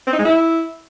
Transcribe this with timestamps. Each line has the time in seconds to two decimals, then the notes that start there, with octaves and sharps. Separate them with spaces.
0.07 C4
0.13 D#4
0.19 G#3
0.25 E4